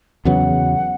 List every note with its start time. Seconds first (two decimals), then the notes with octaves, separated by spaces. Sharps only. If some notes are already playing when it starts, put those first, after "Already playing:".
0.25 E2 C#3 F#3 B3 F#5